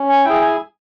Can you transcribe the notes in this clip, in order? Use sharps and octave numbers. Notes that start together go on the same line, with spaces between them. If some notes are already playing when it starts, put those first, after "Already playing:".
Already playing: C#4
G#5
E4 G#4 G5
G#5